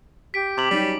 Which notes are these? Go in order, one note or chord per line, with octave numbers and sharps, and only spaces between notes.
G4 B6 D7
C3 D6 F#7
F#3 G3 C#4 D#4